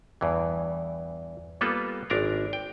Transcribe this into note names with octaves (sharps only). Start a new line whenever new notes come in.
E2 G2 E3
G3 A#3 B3 F4 A4 B4
G#1 D4 A#4 A#5
G5